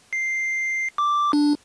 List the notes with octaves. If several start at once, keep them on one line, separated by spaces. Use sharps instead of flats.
C7
D6
D4